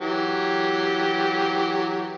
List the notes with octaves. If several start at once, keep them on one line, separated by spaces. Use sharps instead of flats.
E3 F#3 G4